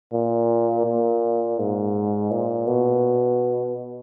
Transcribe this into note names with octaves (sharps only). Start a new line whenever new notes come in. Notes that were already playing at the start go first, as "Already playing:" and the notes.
A#2
A#2
G#2
A#2
B2